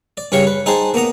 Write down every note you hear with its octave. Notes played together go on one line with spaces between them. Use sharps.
D5
G2 C#3 C#5 F5 G5 C#6
B4
D#4 G#4 C5 G5 A5 C6
A#3 B3 A#5 D#6